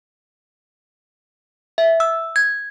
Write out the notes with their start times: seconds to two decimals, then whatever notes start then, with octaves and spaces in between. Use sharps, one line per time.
1.78 E5
2.00 E6
2.36 G#6